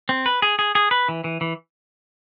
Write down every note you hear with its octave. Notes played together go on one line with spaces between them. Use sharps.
C4
B4
G#4
G#4
G#4
B4
E3
E3
E3